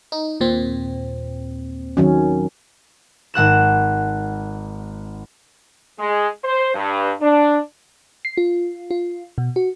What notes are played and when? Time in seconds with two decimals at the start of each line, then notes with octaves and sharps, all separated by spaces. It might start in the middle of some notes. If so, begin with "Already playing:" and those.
0.12 D#4
0.40 D#2 A#2 C4
1.97 D#3 F#3 C#4
3.34 G#1 F#5 F#6 E7
5.99 G#3
6.43 C5
6.74 G2
7.21 D4
8.25 C7
8.37 F4
8.91 F4
9.38 B2
9.56 F#4